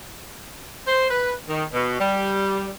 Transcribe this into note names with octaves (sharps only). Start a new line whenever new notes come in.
C5
B4
D#3
B2
G3